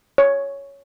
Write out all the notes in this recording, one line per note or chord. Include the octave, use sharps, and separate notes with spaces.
C#5